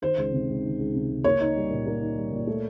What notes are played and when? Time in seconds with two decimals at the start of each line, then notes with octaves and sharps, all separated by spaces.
0.02 D#3 C5
0.18 C#2
0.33 C3
0.49 C#2
0.63 D#3
0.79 C#2
0.94 C3
1.09 C#2
1.24 A#3 C#5
1.41 D#4
1.56 G3
1.70 A#2
1.86 A#3
2.01 D#4
2.17 G3
2.32 A#2
2.47 A3